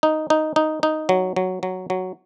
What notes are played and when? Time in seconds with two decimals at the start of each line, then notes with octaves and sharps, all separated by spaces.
0.03 D#4
0.30 D#4
0.56 D#4
0.83 D#4
1.09 F#3
1.36 F#3
1.63 F#3
1.90 F#3